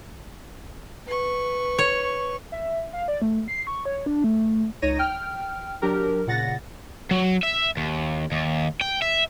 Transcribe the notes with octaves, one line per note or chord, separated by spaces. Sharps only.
B4 C#6
C#5
E5
F5
D5
A3
C7
C#6
C#5
D4
A3
C#2 D#4 C#5 A#6 D#7
G5 F6
F#3 D4 G4 A#4
A#2 C#3 F#5 A6 A#6
F#3
E5
D#2
D#2
G5
E5